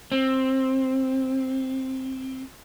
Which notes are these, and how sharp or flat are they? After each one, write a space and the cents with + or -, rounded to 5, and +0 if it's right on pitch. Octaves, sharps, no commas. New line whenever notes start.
C4 +10